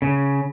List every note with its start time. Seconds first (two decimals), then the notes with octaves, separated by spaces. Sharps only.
0.02 C#3